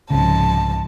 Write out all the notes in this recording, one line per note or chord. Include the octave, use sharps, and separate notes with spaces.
C2 G#2 C#3 F3 A5